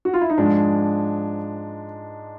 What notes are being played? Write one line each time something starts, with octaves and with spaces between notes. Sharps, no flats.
F#4
F4
E4
D#4
G#2 F3 G#3 D4